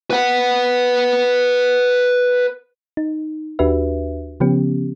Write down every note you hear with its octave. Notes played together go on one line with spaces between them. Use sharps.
B4 F#5
D#4
D#2 D4 F#4 G4 B4 E5
C#3 F3 B3 C#4 G4